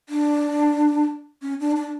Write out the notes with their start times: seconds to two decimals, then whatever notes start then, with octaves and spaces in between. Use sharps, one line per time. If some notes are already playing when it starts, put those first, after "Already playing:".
0.09 D4
1.42 C#4
1.60 D4
1.76 D4